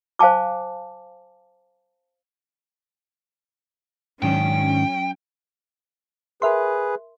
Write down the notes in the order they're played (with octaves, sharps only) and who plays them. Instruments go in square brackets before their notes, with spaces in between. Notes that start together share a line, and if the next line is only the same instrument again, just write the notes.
[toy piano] C5 F5 G#5 A5 D6
[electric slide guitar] G#2 D#3 D4 [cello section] F#3 C#4 [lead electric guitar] G5
[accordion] G#4 B4 [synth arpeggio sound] A#4 E5 C6